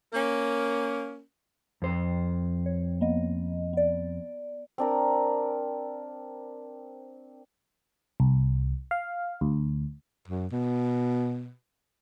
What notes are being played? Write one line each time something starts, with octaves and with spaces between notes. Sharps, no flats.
A#3 C#4 A#4
F2 C5
C#5
A#3 B3 D#5
B3 D5
C4 D4 A#4
C2
F5
D2
F#2
B2